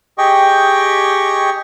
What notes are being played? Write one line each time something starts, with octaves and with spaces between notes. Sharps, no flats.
G4 G#4 D#5 G5 C#6